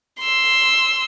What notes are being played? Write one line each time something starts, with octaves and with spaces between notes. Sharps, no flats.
C6 E6